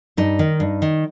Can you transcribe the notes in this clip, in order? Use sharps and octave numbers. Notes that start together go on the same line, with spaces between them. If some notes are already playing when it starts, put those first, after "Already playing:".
G2 D#4
D#3
G2
D#3